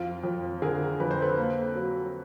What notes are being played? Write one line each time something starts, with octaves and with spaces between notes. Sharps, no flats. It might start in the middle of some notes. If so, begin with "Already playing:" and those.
Already playing: F2 F4
F2
D3 G#4 A#4
F2 B4
C5
A4 B4
A#3
F#3